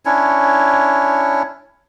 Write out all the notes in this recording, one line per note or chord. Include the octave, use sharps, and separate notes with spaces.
C#4 D4 E4 C#5